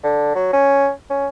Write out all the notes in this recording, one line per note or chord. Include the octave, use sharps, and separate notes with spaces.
D3
F#3
C#4
C#4